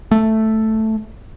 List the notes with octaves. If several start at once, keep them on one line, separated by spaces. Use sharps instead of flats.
A3